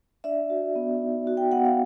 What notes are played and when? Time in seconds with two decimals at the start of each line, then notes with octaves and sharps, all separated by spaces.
0.24 D4 D5 E5
0.50 F#4
0.75 B3
1.02 D#4
1.27 F#4
1.37 G5
1.52 B3 F#5
1.65 F5